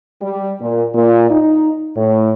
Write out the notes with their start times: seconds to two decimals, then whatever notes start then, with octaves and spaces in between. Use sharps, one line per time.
0.22 G3
0.61 A#2
0.95 A#2
1.30 D#4
1.97 A2